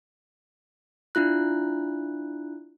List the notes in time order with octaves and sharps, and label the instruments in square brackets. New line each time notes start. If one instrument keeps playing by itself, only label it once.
[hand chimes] D4 E4 F4 F#6